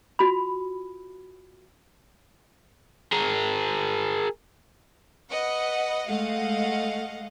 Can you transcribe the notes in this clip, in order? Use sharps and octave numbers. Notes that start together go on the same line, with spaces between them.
F4 F#4 B5
G#4 A#4
B4 D#5 F#5
G#3 A3 D#5 F5 F#5